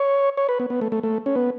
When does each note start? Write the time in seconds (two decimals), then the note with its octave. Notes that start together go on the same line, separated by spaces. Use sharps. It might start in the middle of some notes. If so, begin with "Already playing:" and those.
Already playing: C#5
0.37 C#5
0.49 B4
0.60 B3
0.70 B3
0.81 A3
0.92 A3
1.03 A3
1.26 C#4
1.36 B3